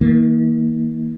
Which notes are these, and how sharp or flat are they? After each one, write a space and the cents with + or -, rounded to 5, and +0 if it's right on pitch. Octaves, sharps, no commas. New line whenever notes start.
D#3 +45 A#3 +0